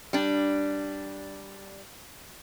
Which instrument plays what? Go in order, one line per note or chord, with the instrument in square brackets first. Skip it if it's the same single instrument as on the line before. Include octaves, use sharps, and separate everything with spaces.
[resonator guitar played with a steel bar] G3 D4